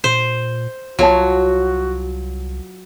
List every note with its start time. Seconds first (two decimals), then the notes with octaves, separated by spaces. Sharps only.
0.04 A#2 C5
0.99 C2 F#3 F4 F#4 C#5 A5